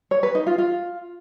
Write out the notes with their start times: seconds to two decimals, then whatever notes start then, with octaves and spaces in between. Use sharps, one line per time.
0.11 C#5
0.23 B4
0.35 D#4
0.47 F4
0.58 F4